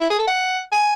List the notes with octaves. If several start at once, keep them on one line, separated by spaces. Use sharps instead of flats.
E4
G#4
A4
F#5
G#5